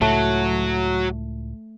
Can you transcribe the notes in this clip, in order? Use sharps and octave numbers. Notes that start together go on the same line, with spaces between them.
C#2 A2 F#3 A3